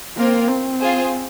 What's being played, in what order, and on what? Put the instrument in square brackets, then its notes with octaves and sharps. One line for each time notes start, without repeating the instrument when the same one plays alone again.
[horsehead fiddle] A#3 [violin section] C4 F4 A#4
[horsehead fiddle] C4
[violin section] F4 G#4 C5